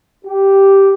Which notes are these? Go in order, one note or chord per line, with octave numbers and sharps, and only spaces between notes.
G4